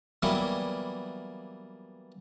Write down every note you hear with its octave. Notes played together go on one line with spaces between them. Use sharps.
E3 F#3 G3 A#3 B3